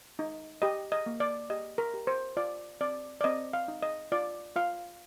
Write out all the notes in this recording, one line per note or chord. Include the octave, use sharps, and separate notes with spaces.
D#4
G4 D#5
D#5
A#3
D5
G4 D#5
A#4
G4
C5
F4 D5
C4 D5
D5
C4 D#5
F5
D#4
D#5
F4 D5
F4 F5